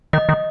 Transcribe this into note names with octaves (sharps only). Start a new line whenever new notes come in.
D#3 D#5
D#3